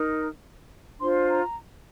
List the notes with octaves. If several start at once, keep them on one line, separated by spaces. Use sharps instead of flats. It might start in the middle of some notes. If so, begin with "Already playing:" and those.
Already playing: D#4 A#4
D4 F4 C5 C6
A#5